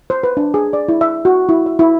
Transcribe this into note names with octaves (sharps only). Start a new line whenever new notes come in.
C5
B4
D4
G#4
D5
E4
E5
F#4
E4
E5
E4